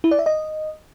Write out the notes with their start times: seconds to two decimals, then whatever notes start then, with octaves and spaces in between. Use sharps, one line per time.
0.04 E4
0.11 D5
0.19 E5
0.26 D#5